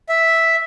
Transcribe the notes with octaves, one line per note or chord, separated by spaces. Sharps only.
E5